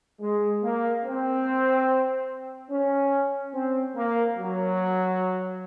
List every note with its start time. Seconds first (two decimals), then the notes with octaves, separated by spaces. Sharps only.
0.21 G#3
0.62 A#3
1.04 C4
2.71 C#4
3.54 C4
3.96 A#3
4.37 F#3